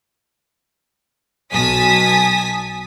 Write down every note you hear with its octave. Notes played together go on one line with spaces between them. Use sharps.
B1 G#5 A5 D#6 B6